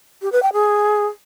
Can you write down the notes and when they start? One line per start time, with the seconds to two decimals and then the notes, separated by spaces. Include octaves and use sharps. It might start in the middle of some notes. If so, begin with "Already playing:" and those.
0.22 G4
0.32 B4
0.43 G5
0.53 G#4